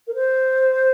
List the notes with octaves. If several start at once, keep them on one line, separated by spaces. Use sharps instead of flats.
A#4
C5